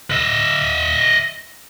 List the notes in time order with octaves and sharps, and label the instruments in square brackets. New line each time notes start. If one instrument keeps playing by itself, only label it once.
[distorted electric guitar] D#5 E5